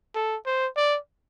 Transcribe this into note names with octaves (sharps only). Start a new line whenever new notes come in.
A4
C5
D5